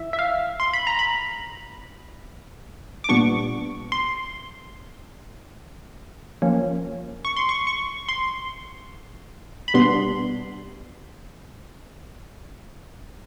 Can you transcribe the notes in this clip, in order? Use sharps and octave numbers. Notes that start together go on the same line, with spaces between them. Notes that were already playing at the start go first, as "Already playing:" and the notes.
Already playing: E3 E5
E5
F5
C6
B5
A#5
B5
D6
A#2 G3 B3 D4 C#6
C6
F3 A#3 C#4
C#6
C6
C#6
C#6
C6
B5
B2 G3 B3 D4 C6